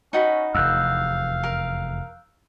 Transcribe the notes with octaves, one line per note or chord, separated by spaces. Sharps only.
C#4 D#4 F#4 B5
F1 E2 F5 E6 F#6 G6
A#4